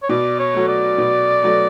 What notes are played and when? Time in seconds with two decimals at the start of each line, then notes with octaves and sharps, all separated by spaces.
0.03 C#5
0.09 B2 D5
0.39 C#5
0.54 F#3 A3
0.69 D5
0.98 B2
1.43 F#3 A3